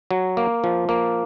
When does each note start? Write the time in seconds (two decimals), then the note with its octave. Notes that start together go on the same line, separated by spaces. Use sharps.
0.11 F#3
0.37 A#3
0.64 F3
0.89 A#3